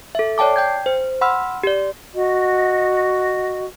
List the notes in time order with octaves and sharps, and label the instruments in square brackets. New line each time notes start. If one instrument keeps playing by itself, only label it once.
[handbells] A4 E5
C#5 D5 G5 A5 D6
G5 G6 G#6
C5
F#5 B5 C6 E6 F6
G4 D5
[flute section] F#4 D#5